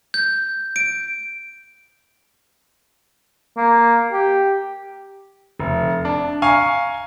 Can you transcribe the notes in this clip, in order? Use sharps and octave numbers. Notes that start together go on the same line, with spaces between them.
G6
D7
A#3
G4
F1
D4
F5 G#5 A#5 C#6